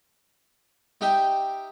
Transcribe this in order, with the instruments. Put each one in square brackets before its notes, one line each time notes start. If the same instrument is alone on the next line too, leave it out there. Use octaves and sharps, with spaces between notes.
[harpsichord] D#4 G4 D#5 E5 G5